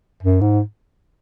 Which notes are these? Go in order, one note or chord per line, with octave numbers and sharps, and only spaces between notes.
F#2
G#2